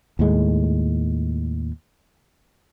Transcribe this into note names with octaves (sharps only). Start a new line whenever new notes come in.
D#2 A2 G#3